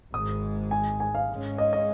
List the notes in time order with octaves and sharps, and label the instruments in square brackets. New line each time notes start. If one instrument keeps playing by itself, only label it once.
[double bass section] G#1 G#2 G#3 [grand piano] D#6
[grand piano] G#5
G#5
F5
[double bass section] G#2 G#3 C#4
[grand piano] D#5
D#5